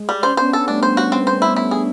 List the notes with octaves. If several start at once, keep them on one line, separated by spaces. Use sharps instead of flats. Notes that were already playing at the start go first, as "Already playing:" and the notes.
Already playing: G#3
G3
C#4 C5
D4
B3 C#4 C5
A4
G3 A3 D4
C5
F#4
C4
C5
E4
E4
G#4